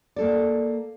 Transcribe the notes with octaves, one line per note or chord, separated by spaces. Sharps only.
A#3 A4 D5